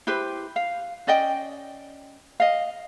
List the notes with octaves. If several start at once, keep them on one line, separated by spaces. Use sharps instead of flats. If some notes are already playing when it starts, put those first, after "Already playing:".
E4 G4 B4 C5
F5
C#4 D5 D#5 G5
D#5 F5